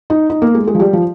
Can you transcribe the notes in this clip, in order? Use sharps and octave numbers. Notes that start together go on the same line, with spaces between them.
D#4
D#4
A#3
G#3
G#3
F3
G3
F3